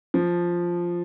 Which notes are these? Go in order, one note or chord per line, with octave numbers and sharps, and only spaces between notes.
F3